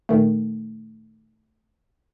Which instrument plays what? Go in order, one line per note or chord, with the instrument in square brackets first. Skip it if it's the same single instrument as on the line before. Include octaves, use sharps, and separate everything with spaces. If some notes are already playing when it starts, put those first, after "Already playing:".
[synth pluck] A#2 D#3 A3